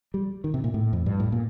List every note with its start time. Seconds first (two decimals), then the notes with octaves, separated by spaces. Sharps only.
0.14 G3
0.44 D#3
0.54 C3
0.64 A#2
0.74 A2
0.93 F2
1.06 G2
1.20 A2
1.32 A#2